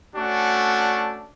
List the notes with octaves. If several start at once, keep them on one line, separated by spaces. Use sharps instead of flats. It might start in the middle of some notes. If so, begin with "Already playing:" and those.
A3 C#4 D4 F#4